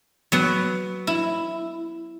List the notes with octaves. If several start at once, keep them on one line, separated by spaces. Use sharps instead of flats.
F#3 B3
E4